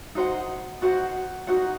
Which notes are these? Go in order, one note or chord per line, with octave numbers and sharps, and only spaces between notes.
D#4 F#4 C5 F#5
D#4 F#4 C5 F#5
D#4 F#4 C5 F#5